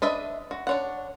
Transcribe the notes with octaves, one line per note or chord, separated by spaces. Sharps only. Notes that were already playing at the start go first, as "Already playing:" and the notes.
D4 B4 D#5 E5
F#4
D4 C#5 F#5